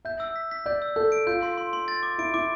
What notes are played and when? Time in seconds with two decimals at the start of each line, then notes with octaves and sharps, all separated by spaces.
0.05 E5 G6
0.20 E6
0.36 B6
0.51 B6
0.66 D5 G6
0.82 E6
0.96 A4 G6
1.12 D7
1.27 F4 G6
1.43 C6
1.58 C6
1.73 C6
1.88 A6
2.03 D6
2.18 E4 D7
2.34 E4 D6